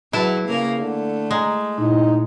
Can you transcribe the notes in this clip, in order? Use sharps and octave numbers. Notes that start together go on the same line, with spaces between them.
F#3 E4 G#4 B4 E5 A5
C#3 A#3 A#4
D3 A3
G#3 C#5 A#5
A#2 D#4 E4